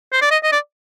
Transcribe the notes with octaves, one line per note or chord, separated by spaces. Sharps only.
C5
D5
D#5
D#5
D5